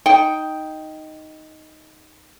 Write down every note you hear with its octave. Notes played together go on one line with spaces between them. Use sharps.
D#4 G5